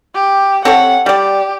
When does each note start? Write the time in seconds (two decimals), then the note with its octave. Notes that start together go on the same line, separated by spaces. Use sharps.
0.15 G4
0.65 C4 A4 C#5 F#5
1.06 G3 G4 D5